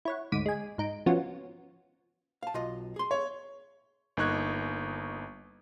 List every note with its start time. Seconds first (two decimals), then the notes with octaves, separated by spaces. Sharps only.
0.05 E4 C#5 F#5
0.32 D2 G#2 D6 B6 D#7
0.46 G#3 G#5
0.78 G#2 D#4 D7
1.06 F3 B3 C#4 F4 F#4
2.43 F5 A5
2.54 B1 F4 D#5
2.96 G#4 C6
3.11 C#5
4.17 G1 A#3 D#4 C#6 F#6 G#6